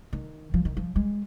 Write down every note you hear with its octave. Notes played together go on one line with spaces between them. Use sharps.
D#3
F3
D#3
F3
G#3